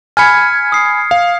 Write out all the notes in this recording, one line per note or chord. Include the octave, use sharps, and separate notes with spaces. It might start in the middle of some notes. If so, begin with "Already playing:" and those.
G#5 B5 F6 G#6 C#7
D#6 C7
F5